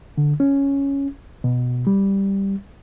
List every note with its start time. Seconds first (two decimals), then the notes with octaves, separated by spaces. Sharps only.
0.18 D3
0.40 C#4
1.44 B2
1.87 G3